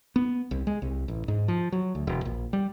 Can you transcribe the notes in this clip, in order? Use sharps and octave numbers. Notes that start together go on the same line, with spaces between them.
B3
C2
G#3
C2
A1
G#2
F3
F#3
D2
E1
A#1
G3